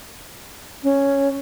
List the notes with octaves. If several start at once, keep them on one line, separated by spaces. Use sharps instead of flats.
C#4